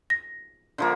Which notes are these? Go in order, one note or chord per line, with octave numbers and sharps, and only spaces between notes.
A#6
D3 F3 A#3